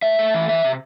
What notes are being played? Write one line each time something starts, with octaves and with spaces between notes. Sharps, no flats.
A3 E5
A3
E3
E3 E5
C3